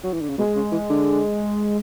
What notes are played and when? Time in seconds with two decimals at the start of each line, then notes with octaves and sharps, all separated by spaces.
0.04 F#3
0.13 E3
0.21 D3
0.29 C#3
0.38 B2 G#3
0.56 C#3
0.72 E3
0.90 D3